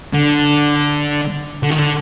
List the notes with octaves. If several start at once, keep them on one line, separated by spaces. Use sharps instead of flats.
D3
D3
D#3
D3